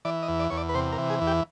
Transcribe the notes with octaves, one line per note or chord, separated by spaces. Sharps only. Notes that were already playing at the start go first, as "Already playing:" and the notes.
E3 D5
D#5
E2
D5
E2 C#5
D5
B4
C3 C5
A#4
E3
G#4
E2
G4